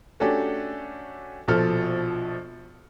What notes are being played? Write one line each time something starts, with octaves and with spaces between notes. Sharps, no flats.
A3 C#4 D4 F#4 G4 A4
A#1 B2 F3 A4 F6